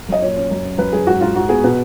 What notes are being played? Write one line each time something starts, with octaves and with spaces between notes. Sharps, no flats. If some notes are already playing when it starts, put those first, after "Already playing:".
F#2 D#5
A#2 C#5
C#4
F#2
C#4
F#2 B4
F#2 G#4
G#2 F#4
G#2 F4
G#2 F#4
B3 G#4
B2 B4